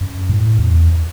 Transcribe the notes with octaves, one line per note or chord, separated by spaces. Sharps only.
F#2
A2
E2